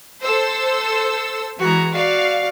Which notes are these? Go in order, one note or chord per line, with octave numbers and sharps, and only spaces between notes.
A4 C5 E6
E3 G#3 F#4 A#5
F#4 D5 F5